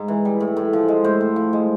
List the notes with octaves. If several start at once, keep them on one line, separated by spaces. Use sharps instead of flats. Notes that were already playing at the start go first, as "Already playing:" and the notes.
Already playing: G#2
E3
G3
A2
A2
F3
G#3
A2 C5
A2
F3
G#3